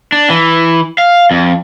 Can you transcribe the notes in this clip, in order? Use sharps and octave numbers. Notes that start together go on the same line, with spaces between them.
D4
E3
F5
F2